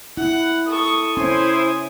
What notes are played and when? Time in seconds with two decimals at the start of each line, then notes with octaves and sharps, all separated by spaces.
0.17 E4 F#5
0.68 A4 C#6 D#6
1.17 C#4 E4 C5 G#5 C6